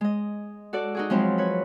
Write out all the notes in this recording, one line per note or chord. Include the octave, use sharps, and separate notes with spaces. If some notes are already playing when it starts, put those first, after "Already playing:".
G#3 D#5
F#4 A4 D5
D#4 F#4 G#4
F3 F#3 G#3 C4 E4 F4
B4 C#5